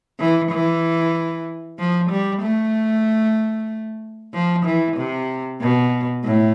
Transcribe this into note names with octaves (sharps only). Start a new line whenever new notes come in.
E3
E3
F3
G3
A3
F3
E3
C3
B2
A2